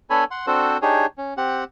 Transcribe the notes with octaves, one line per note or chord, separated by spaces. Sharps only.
B3 D4 A4 C#5 G#5 B5
F#5 C6
C4 D4 F#4 A4 C5
D4 D#4 G4 G#4 C#5
C#4
C4 G4 F#5